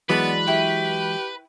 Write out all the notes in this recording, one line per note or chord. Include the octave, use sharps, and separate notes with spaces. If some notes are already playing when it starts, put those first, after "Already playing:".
E3 F#3 G#3 B3 B4 D5 A5
E4 G4 G5 C#6